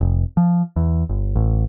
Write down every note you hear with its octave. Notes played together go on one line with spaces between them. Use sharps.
F1
F3
E2
G1
A1